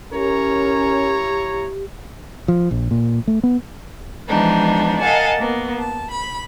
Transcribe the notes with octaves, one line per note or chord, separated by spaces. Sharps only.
C#4 E4 G4 A#4 C#5 A#5
F3
A#1
A#2
A3
B3
E3 F3 G#3 B3 D4 D#4
A#4 D#5 F5 F#5 G#5 A5
A#3 B3
A5
B5